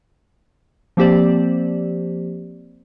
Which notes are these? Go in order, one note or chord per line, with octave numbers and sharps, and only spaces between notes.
F3 A#3 C4 G4 C5 D5